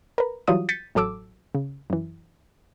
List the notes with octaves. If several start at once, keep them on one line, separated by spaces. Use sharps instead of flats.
A#4 B4
E3 F#3 G3 F4 D#6 D#7
G6 A6 B6 C#7 D#7
A1 F#3 A4 D6 E6
C#3
F#2 E3